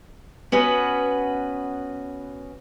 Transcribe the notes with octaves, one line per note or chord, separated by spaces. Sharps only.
B3 C#4 F#4 B4